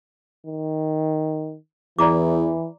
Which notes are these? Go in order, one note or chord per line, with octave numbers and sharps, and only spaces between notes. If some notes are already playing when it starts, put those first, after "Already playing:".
D#3
E2 E3 D5 A#5 D6